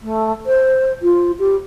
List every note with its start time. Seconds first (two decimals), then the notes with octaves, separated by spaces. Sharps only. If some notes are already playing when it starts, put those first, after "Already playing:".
0.02 A3
0.46 C5
1.02 F4
1.39 G4